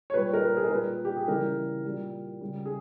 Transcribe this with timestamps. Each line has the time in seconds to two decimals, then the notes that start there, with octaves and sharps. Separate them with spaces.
0.10 C#5
0.14 A#2 G3 B4
0.33 A#4
0.42 B4
0.57 G#4
0.64 A#4
0.71 A#2 G3 B4
1.05 G4
1.17 G#4
1.28 C#3 E3 G3 A#4
1.84 A#2 G3
2.41 C#3 G3
2.66 G#4